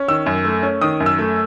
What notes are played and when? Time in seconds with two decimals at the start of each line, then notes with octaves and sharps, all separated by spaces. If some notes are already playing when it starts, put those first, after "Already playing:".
Already playing: C#4
0.08 D#3 E6
0.26 F#2
0.45 A3
0.63 C#4
0.81 D#3 D#6
1.00 F#2
1.06 E6
1.19 A3